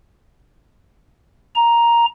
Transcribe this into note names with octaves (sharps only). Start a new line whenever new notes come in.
A#5